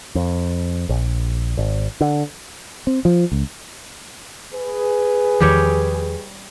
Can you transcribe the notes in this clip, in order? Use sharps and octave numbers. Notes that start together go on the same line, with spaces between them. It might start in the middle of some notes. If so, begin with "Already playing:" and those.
F2
A#1
G#1
D3
C4
F3
C#2
G#4 B4
E2 D#3 F3 G3 G4 C#5